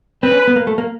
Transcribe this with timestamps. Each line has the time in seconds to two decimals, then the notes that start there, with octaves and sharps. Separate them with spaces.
0.23 C4 B4
0.32 C#4
0.48 B3
0.56 A#3
0.67 A3
0.78 A#3